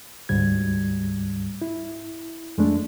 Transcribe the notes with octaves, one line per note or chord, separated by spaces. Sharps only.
D2 G#2 G3 G#6
E4
F2 G#3 A3 D4